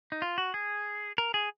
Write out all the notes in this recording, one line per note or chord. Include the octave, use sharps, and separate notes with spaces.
D#4
F4
F#4
G#4
A#4
G#4